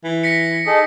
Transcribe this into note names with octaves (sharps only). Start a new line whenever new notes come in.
E3
A#6 B6 C#7
D#4 G#4 A4